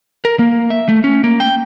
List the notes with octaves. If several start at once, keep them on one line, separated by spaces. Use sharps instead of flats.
A#4
A#3
E5
A3
C#4
A#3
G5